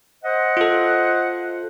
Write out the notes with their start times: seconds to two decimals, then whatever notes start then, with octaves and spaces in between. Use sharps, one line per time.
0.24 C5 D#5 F#5
0.57 F4 A4